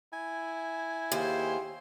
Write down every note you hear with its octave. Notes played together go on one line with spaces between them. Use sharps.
E4 G#5
D#2 F4 G#4 C5